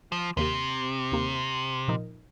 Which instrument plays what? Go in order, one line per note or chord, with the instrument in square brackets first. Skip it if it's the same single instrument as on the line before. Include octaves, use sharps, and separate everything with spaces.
[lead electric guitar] F3
[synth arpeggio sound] D#2 D#3 A#3 G4 [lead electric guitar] C3
[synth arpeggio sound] D#2 D#3 A#3 G4
A#2 F3 D#4 A#4